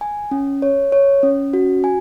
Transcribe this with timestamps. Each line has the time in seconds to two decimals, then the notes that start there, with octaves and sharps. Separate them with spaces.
0.01 G#5
0.31 C#4
0.62 C#5
0.92 C#5
1.23 C#4
1.53 F#4
1.84 G#5